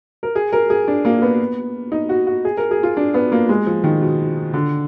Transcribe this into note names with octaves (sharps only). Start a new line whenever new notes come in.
A#4
G#4
A#4
G#4
D4
A#3
B3
D#4
F#4
F#4
G#4
A#4
G#4
F4
D4
B3
A#3
G#3
F3
D#3
B2
D3